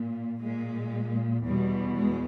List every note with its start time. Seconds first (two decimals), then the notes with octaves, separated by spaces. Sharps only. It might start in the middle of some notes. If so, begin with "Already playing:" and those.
Already playing: A#2
0.41 A#2 G#3
1.44 E2 B2 G3
1.96 G#3